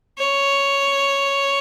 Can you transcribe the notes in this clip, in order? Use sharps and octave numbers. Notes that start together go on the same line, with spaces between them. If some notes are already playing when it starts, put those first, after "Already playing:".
C#5